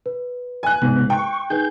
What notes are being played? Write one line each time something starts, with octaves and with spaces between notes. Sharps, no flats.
B4
G#5 F#6
G#2 C3 B3
G5 C#6
D#4 G#4 B4 G6